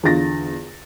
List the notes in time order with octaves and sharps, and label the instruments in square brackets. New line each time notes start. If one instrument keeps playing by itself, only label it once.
[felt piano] E2 D3 F4 A6 A#6